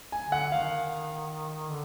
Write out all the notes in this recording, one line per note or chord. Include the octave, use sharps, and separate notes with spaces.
G#5
D3
F#5
D#3 F5
D3